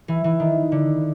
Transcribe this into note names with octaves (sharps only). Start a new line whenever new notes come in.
E3
E3
D#3
D3